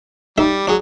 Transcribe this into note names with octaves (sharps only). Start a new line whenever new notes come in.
G3 D#4 A4 E5
F#3 G#4 D5